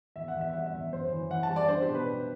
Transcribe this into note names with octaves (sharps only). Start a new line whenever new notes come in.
E2 E5
F#5
E2
E5
G3 F#5
E5
E2
F#2 C5
E3
E3 F#5
A5
G3
D5
D4 C5
G4
B2
B4
B2